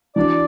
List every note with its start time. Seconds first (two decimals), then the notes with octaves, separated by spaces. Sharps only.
0.16 E3 D4 F#4 D5